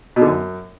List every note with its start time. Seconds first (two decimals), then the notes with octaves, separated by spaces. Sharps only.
0.16 B2
0.21 D3
0.27 F#2